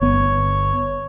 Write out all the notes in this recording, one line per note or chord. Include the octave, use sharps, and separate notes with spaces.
G1 B3 C#5